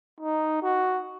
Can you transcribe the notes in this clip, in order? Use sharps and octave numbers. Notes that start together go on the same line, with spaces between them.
D#4
F#4